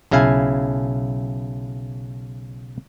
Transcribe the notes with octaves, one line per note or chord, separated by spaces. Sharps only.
B1 C#3 E4 F5 G#5